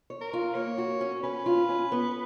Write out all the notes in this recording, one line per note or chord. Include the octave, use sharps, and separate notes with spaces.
C#5
A#4
F4
A#3 C#5
F#4
C#4
C#4 B4
F4
C#4
B3